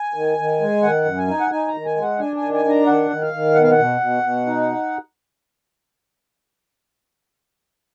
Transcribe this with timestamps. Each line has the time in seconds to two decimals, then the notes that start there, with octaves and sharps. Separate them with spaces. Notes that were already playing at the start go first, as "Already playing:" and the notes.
Already playing: G#5
0.14 D#3
0.38 D#3
0.60 G#3
0.83 D#3 F#5
1.05 F#2
1.18 G#5
1.28 D#4
1.40 F#5
1.51 D#4 G#5
1.68 A#5
1.74 D#3
1.85 G#5
1.96 G#3
2.02 F#5
2.19 D4 G#5
2.36 G#5
2.42 D#3
2.54 G#5
2.65 D4 A#5
2.87 D#3 F#5
3.10 D#3
3.21 F5
3.33 D#3
3.55 B2 F#5
3.63 F5
3.71 F#5
3.78 B2
4.00 B2
4.23 B2
4.47 D#4